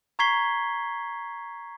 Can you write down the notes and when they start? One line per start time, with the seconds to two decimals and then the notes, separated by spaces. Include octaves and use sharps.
0.19 A#5 C#6 G#6 B6 C7 G7